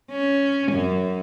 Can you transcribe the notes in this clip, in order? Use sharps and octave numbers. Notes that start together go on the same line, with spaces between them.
C#4
F#2